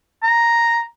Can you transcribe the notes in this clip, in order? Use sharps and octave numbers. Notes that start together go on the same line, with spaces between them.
A#5